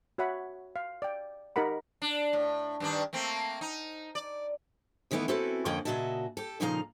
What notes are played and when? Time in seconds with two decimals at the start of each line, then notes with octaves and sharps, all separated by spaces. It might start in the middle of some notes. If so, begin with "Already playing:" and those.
0.18 F#4 C#5 E5 F#5 B5
0.76 F5
1.02 D5 G5
1.56 D#4 G4 A#4 F#5 B5
2.02 D4
2.33 A2
2.80 G2 D#3 D4
3.13 A3 A#3 C4
3.61 D#4
4.15 D5
5.11 E2 D#3 E3 A3 B3 E4
5.28 C4 C#4 E4 F#4 A4 B4
5.65 F2 D3 A#3 C#4 D#5 G5
5.85 A#2 C#3 F#4 D#5 E5 A5
6.37 G4 A4
6.60 A#2 C#3 F3 D#4 F5 A#5